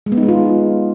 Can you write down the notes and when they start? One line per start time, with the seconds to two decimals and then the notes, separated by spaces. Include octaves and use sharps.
0.06 G#3
0.12 B3
0.17 D#4
0.23 G#3
0.28 F4